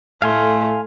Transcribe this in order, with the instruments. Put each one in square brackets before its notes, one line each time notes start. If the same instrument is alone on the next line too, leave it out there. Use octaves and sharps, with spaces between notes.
[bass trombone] A2 [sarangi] A3 [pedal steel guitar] F5 G#5 C6